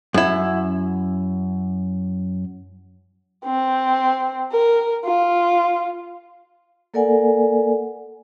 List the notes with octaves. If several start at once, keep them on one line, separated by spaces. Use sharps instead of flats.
F#2 E4
C4
A#4
F4
A#3 A4 A#4 D5 F#5 G#5